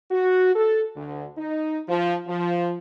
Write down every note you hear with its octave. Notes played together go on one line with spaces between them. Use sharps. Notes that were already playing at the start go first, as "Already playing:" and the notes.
F#4
A4
D2
D#4
F3
F3